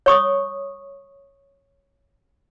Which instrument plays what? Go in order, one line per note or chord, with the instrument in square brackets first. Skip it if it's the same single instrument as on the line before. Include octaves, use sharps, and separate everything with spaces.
[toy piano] C#5 C#6 D#6